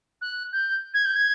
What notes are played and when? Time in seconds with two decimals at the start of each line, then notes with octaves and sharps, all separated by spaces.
0.21 F#6
0.52 G6
0.94 G#6
1.05 G6
1.15 G#6